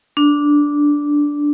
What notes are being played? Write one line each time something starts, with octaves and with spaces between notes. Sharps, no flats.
D4